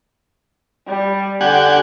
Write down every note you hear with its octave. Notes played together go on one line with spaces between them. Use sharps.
G3
D3 G4 F#5 G#5